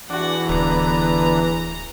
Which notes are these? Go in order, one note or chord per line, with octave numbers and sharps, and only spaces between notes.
E2 E3 D4 F#4 F#5
D1 D3 B3 A#5